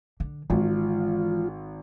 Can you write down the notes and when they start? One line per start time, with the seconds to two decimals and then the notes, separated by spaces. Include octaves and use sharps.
0.20 D3
0.50 G#1 E3 G#3 F4